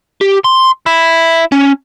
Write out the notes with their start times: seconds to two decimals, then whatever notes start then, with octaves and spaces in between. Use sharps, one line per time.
0.21 G4
0.44 C6
0.86 E4
1.52 C#4